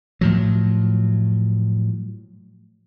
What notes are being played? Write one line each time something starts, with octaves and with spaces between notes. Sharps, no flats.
A2 F3 F#3